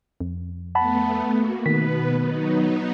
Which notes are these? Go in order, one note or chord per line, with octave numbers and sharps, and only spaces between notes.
F2
A3 B3 F#5 A5 B5
A#3 F#4
B2 D#3 B3 B4 B6
F#3 B3 D#4